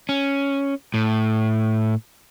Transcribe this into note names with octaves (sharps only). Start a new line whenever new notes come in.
C#4
A2